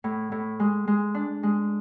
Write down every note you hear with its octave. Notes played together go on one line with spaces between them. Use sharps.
A2
A2
G#3
G#3
D4
G#3